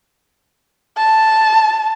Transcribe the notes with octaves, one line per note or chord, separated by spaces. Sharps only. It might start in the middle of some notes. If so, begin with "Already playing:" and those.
A5